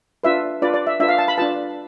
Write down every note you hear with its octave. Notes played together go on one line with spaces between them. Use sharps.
D4 F4 B4 E5
D4 F4 B4 D5
D5
E5
D4 F4 B4 E5
F5
A5
B5
D4 F4 B4 A5